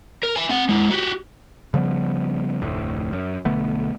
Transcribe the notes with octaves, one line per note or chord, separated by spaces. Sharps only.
A#4
E5 G#5
C4 F#5
G#3 E4
F#4 G4
C#3 F3 G3 B3
F1 D2 A2
F#2
B1 D3 A3 B3